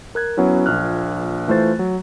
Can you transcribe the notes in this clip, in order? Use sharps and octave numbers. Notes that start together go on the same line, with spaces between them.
A#4 F#6 G#6
F#3 B3 C#4 E4
A#1 A#2 F6 F#6
E3 A3 F4 C5 A6
F#3